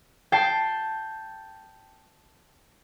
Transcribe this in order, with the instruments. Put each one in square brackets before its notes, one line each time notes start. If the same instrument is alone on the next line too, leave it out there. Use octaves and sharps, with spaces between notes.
[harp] G5 A5 G6 C7